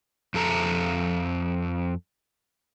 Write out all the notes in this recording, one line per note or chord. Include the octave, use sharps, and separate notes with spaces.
F2 A4 A#5